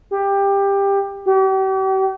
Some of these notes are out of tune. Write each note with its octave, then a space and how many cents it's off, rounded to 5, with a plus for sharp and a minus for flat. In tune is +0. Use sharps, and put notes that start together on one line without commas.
G4 +15
G4 -40